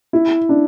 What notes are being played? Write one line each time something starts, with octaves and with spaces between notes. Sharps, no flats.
E4
D4